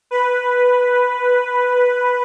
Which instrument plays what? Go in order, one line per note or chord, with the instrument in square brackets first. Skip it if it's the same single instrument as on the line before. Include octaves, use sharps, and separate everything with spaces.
[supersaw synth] B4